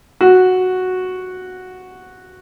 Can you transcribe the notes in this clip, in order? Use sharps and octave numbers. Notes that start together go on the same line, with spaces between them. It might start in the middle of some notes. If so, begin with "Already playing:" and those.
F#4